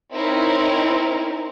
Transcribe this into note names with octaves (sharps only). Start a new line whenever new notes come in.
C4 C#4 D#4 E4 A#4